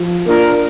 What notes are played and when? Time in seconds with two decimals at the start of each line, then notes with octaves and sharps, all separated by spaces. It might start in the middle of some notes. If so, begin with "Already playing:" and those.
Already playing: F3
0.26 A#3 D4 F4 A#4